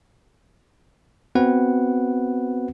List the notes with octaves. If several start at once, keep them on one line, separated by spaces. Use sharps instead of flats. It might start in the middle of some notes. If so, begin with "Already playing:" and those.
B3 C4 F#4 B4 F#5